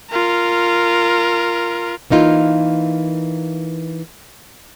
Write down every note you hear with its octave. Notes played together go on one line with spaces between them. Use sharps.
F4 A#4
E3 A#3 D#4 F4